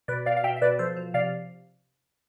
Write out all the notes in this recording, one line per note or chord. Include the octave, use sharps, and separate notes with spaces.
B2 B4 D5
B2 D5 F5
F5
B2 E5 G5
E5
B2 B4 D5
F3 A4 C5
F3
C3 D5 F5